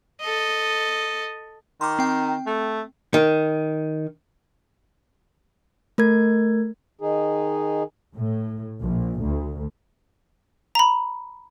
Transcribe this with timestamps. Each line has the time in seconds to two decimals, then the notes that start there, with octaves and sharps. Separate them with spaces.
0.21 A4 D#5
1.81 D#3 C6 D6
1.99 C4 G5
2.46 A3
3.14 D#3
5.98 A3 A#4 G#6
7.01 D#3 D#4 G#4
8.15 A2
8.82 A#1
9.23 D2
10.75 A#5 B5